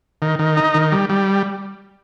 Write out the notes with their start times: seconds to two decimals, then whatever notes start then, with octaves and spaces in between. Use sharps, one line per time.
0.22 D#3
0.39 D#3
0.57 D#4
0.74 D#3
0.92 G3
1.09 G3